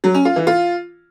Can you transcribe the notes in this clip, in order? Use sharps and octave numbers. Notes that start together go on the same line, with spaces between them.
F#3
C#4
F4
E3
F4